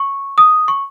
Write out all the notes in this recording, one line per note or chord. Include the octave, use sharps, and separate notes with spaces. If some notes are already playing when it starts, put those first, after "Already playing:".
Already playing: C#6
D#6
C#6